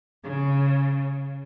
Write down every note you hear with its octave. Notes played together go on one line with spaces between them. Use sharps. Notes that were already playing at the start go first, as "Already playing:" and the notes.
C#3